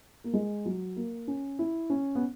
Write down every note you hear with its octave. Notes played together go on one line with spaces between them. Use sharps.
A#3
G#3
F#3
A#3
C#4
E4
C#4
B3